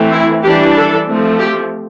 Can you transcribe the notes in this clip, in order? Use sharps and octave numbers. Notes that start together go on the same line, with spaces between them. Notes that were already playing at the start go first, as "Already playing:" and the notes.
Already playing: E3 A3 C4
E4
E3 G3 D4 G4
A4
F3 A3 C4
G4